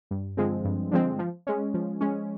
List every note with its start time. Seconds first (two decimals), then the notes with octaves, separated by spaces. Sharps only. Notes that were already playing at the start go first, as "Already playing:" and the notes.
0.11 G2
0.37 D3 F3 G#3 C4
0.65 G2
0.91 D3 F3 G#3 C4
1.19 F3
1.47 G#3 C#4
1.74 F3
2.01 G#3 C#4